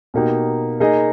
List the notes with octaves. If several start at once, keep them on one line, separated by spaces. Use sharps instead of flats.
B2 A#3 D#4 G4
A#3 D#4 G#4 D#5